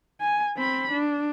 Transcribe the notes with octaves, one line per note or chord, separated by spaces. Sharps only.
G#5
C4 B5
D4